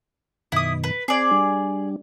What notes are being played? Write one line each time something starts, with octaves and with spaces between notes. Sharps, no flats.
F#2 B2 D#3 E4 D#6
B4
C4 G#4 D5
G3 D4